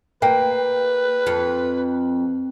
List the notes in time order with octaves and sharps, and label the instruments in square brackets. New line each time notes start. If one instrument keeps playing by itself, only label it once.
[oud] A#3 [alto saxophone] B4 [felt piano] G5
[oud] F2